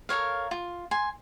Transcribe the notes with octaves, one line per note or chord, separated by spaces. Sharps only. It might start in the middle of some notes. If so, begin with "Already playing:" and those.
A4 A#4 C#5 F5
F4
G#5 C6